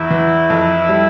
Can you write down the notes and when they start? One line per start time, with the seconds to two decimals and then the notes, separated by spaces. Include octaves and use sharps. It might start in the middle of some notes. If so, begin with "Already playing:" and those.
Already playing: E2 E4
0.10 E3
0.50 F2
0.89 G3